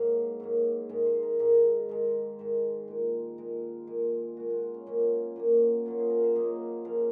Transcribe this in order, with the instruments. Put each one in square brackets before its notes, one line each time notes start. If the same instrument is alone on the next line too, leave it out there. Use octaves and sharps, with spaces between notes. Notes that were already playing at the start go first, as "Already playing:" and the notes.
Already playing: [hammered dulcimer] G#2 F#3 A#3 F5
G#2 F#3 A#3
G#2 D#3 G#3 D#5
C5
A#4
G#2 D#3 G#3 A#4
G#2 D#3 G#3
G#2 D#3 G#3 C5
A#2 G#3
A#2 G#3 A#4
A#2 G#3
A#2 G#3 F#4
F4
D#4
C#4
A#2 F#3 A#3 C#4
A#2 F#3 A#3
A#2 F#3 A#3 F4
G#4
A#4
C5
A#2 F#3 A#3 D#5
C#3 F3 A#3 F5